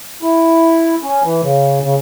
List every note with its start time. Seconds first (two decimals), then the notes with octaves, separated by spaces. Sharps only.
0.22 E4
1.03 C#4
1.23 E3
1.43 C#3
1.83 C#3